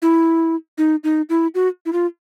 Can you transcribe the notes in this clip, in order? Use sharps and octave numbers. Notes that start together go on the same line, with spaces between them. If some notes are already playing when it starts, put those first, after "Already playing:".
E4
D#4
D#4
E4
F#4
E4
F4